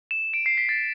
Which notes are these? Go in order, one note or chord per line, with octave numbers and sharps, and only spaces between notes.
E7
D7
C7
B6
A6